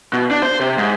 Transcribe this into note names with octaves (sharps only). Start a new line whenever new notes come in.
B2
D4
C5
C3
G#2